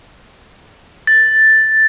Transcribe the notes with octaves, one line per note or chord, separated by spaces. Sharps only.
A6